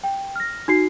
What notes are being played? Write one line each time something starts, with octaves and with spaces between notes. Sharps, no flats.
G5
F6 A#6
D#4 F#4 C7